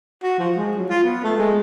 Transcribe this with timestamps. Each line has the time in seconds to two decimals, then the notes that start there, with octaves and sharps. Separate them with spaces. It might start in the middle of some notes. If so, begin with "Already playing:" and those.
0.23 F#4
0.39 F3
0.57 G#3
0.77 F#3
0.89 F4
1.04 B3
1.24 A3
1.38 G#3